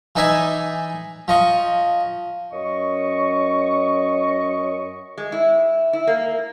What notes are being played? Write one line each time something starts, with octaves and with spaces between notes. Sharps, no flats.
E3 D#4 D5 E5 G#5
F3 D#5 C#6
F#2 C#4 D#5 C#6
G#3
E4
E4
A#3